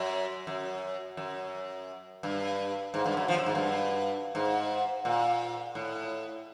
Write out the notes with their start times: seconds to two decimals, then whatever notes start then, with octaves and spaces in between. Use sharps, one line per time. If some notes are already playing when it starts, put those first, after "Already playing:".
Already playing: F#2
0.47 F#2
1.17 F#2
2.23 G2
2.94 G#2
3.06 G2
3.17 F#2
3.28 F3
3.38 F#2
3.46 G#2
3.55 G2
4.35 G#2
5.05 A#2
5.75 A2